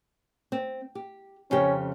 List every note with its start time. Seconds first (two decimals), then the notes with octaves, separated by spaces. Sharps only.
0.52 C4
0.95 G4
1.51 F2 C#3 C#4 G4